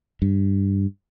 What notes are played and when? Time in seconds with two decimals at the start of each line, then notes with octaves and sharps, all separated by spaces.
0.22 G2